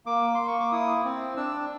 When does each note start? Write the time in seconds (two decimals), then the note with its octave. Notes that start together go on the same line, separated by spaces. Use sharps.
0.06 A#3 D6
0.35 A#3 C6
0.48 C#6
0.60 D6
0.72 E4 D#6
1.04 C4
1.37 D4 E6